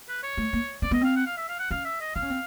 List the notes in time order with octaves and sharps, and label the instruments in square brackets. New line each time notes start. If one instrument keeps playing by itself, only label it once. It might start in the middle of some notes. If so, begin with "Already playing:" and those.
[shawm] B4
C#5
[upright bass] A3
A#3
[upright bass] C4 [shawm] D5
[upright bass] B3 [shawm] D#5
[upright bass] C4 [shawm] F5
[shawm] F#5
F5
E5
F5
F#5
[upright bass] C#4 [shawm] F5
[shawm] E5
D#5
[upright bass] D4 [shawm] F5
[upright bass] C#4
C4